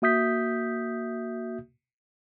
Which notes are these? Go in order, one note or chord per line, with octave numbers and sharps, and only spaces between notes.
A#3 F#4 E5 D#6 G6 B6